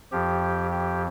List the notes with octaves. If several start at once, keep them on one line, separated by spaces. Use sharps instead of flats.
F2 F3 G4
G4